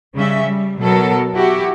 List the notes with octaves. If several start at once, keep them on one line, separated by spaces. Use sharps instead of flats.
C#3 G3 C#4 E5
G3
B2 F#3 B3 A4 A#4
E4 F#4 G4